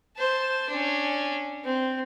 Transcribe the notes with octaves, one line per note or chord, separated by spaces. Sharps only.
C5 A5
C#4 D4
C4